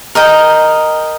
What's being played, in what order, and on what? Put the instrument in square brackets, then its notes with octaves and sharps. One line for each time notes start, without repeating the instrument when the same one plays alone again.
[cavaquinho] A#4 D#5 G5